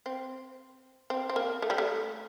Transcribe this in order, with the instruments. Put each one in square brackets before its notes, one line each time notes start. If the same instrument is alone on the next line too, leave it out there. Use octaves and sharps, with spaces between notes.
[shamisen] C4
C4
C4
A#3
A3
G3
A3